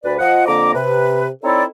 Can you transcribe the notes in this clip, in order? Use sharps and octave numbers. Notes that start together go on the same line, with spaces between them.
D2 B4 D5
F3 D#5 F#5
F2 D3 A#3 A#5 D6
C3 B4
C4 D#4 E4 A4 C#5 D5